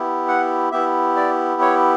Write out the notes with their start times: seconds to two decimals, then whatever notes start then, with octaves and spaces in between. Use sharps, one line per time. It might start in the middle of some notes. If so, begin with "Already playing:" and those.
Already playing: B3 E4 G4
0.28 F#5
0.72 B3 E4 G4 E5
1.17 D5
1.61 C#5